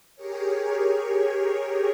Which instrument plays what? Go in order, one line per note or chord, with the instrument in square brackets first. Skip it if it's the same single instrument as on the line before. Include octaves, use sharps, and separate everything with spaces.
[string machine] G4 G#4 A#4 C#5